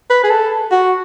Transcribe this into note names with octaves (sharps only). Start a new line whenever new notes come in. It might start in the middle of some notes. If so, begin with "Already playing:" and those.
B4
G#4
A4
F#4